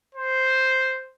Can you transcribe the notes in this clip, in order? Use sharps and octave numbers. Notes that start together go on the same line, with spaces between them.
C5